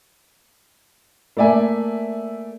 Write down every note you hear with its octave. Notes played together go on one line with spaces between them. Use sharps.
A3 A#3 D5 E5 G#5